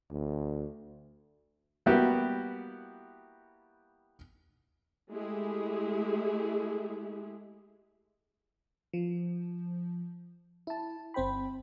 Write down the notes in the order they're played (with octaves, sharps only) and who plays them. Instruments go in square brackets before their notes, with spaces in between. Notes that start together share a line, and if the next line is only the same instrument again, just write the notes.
[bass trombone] D2
[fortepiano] G3 A#3 B3 E4 F#4 G4
[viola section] G#3 A3 E4 G4 G#4
[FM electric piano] F3
E4 A5
G1 C4 C5 G5 B5